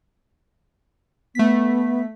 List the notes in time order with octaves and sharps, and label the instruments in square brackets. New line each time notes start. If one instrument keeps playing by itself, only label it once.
[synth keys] A3 B6 [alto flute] B3